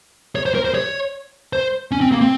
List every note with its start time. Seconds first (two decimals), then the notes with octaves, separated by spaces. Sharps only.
0.35 C#5
0.46 C5
0.54 A#4
0.65 C5
0.75 C#5
1.53 C5
1.92 C#4
2.01 C4
2.12 A#3
2.21 C4